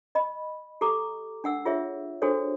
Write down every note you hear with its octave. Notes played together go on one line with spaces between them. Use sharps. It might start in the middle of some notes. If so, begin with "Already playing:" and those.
D#5 B5
G4 A4 A#5 D6
D4 F#5 E6
F4 G#4 C#5 E5
D4 F#4 G#4 A4 C5 C#5